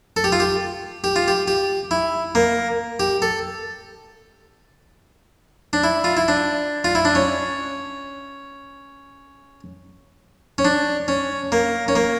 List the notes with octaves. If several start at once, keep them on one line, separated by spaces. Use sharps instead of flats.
A4
G4
F4
G4
G4
F4
G4
G4
E4
A#3
G4
A4
D4
E4
F4
E4
D4
F4
E4
D4
C#4
C#4
D4
C#4
A#3
C#4
A#3